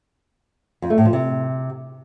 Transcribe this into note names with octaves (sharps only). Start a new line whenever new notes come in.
F2
A3
A2
F3
C3